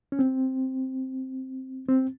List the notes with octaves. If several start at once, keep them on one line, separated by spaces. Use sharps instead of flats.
C#4
C4
C4